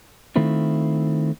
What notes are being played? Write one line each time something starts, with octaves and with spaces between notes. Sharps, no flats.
D#3 A3 C4 E4 F4